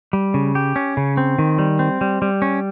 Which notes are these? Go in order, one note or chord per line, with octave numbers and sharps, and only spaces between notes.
G3
C#3
G4
C#4
C#3
C4
D#3
G3
C4
G3
G3
C#4